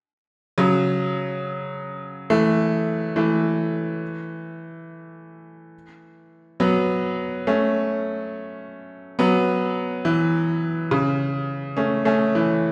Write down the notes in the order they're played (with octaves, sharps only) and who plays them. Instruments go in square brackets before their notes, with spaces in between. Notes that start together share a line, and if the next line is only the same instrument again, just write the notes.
[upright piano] C#3 F#3
E3 A3
E3 A3
F#3 B3
A3 C#4
F#3 B3
E3
C#3
A3 C#4
A3 C#4
E3